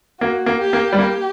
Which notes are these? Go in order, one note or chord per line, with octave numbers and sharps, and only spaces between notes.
A#3 F#4
A#3
G4
A#3
G3
A#3 G4